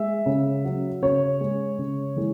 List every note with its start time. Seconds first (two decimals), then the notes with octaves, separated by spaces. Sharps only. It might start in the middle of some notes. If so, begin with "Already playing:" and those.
Already playing: G#3 E5
0.26 C#3
0.65 F#3
1.02 C#3 C#5
1.41 G#3
1.78 C#3
2.16 E3 G#3